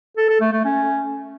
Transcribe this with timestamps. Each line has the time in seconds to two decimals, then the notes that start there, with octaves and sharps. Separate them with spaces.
0.17 A4
0.29 A4
0.41 A3
0.53 A3
0.64 C#4